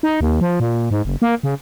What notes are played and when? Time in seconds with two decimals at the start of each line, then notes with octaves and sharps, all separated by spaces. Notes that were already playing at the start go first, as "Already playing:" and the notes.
0.03 D#4
0.21 D#2
0.41 F3
0.60 A#2
0.91 G#2
1.05 F#1
1.22 A#3
1.43 C#3